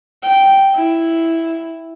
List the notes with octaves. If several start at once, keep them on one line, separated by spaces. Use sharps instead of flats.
G5
E4